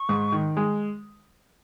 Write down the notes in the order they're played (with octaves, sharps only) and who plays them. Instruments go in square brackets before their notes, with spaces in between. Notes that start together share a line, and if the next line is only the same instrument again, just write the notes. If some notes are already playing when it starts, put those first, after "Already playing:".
Already playing: [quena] C#6
[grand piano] G#2
D#3
G#3